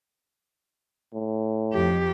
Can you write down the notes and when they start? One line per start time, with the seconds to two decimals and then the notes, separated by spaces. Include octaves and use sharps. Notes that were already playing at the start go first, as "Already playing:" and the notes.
1.13 A2
1.73 F2 G4